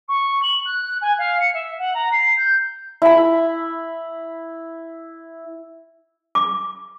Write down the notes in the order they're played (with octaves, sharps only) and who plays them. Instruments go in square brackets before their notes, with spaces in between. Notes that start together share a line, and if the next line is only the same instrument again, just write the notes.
[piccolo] C#6
F#7
F#6
G#5
F5
C#7
E5
F#5
A#5
C7
G6
[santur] E4 B5
[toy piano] D6